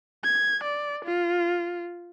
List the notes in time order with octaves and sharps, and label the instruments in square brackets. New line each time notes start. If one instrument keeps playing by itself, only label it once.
[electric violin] G#6
D5
F4